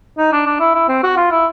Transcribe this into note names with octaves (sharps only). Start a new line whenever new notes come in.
D#4
D4
D4
E4
E4
C4
F#4
F4
E4